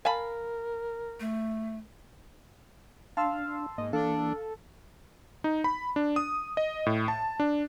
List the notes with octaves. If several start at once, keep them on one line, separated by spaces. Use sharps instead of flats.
A#4 F5 G#5 A5 B5
A3
D4 F5 A5 C6 E6
G#2 A#3 D#5
E3 A#3 D4 A4 F5
D#4
B5
D4
D#6
D#5
A2
A5
D4